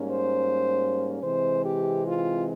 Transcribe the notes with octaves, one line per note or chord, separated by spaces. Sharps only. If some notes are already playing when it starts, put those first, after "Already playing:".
Already playing: G#2 G3 A#3 C#4
C5
C3 E3 G#3 C4 C5
G4
F4